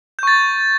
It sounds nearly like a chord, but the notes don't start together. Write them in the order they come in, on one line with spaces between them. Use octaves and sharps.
G6 C#6 A6